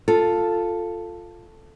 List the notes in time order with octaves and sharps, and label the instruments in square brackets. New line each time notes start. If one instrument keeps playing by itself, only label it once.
[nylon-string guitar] F4 A4